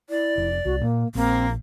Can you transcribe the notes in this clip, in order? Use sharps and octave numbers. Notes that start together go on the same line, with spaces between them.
E4 D5
F1
C2 F#4
A#2 A#3
A#1 A#3 C4